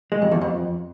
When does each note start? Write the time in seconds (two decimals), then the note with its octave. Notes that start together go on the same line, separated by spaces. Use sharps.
0.12 G#3
0.22 F2
0.32 E2
0.41 F2